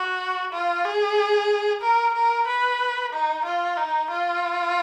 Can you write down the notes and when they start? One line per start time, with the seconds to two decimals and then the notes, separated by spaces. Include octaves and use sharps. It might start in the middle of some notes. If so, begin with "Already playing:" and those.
Already playing: F#4
0.52 F4
0.85 G#4
1.82 A#4
2.14 A#4
2.47 B4
3.13 D#4
3.45 F4
3.77 D#4
4.10 F4